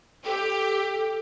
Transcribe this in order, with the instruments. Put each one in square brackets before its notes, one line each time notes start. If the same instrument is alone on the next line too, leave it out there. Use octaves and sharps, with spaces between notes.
[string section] G4 [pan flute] A4